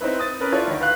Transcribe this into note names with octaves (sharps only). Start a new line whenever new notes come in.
C4 D#4 E4 B4
D#6 A6
C#4 A#4 B4
E4 F4 A4 C#5 D5
D2 D#3
B4 F5 F#6